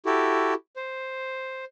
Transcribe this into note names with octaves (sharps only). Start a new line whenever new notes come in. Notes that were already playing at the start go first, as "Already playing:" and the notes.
E4 F#4 G4 A4
C5